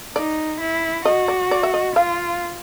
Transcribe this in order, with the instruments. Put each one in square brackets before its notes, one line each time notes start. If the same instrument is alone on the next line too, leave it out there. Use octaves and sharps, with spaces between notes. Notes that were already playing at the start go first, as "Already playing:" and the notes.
[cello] D#4 [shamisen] D5
[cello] E4
[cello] F#4 [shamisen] D#5
[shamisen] D5
D5
E5
D#5
[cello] F4 [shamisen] F5